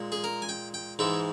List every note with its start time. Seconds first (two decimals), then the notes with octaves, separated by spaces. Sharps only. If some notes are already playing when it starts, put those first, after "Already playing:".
Already playing: A#2 G#3
0.12 G#4
0.24 A#4
0.42 G#5
0.49 G5
0.74 G5
0.99 G#2 E3 G#3 E5